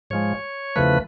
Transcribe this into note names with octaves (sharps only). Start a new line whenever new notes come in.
G#2 F3 G#3 C#5
E2 C#3 F3 A3 B4